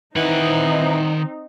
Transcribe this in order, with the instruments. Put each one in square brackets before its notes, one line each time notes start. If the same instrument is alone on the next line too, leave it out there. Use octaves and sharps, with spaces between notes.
[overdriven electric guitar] D#3 F#5 [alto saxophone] E3 [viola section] C4 D#4